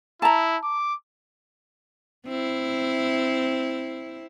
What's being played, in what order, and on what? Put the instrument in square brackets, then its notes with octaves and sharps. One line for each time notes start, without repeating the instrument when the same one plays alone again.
[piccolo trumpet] E4 [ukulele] A5 A#5
[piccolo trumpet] D6
[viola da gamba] C4 E4